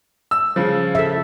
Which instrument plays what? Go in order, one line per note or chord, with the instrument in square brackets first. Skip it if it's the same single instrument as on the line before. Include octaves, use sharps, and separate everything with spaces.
[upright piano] E6
C#3 F3
[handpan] A4 E5